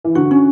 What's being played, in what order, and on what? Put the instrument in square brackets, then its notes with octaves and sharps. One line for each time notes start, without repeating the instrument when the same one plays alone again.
[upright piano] E3
[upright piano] D3 [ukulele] F#4
[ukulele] C#4